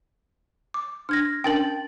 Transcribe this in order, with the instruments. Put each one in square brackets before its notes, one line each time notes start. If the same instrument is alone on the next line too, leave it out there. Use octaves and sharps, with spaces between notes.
[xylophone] D6
[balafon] D4 [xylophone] F6 G#6 A#6
[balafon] C#4 D4 A#4 [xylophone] G5 A6 F#7